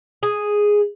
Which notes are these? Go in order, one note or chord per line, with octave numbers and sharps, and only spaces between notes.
G#4